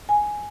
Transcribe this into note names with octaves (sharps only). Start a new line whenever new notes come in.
G#5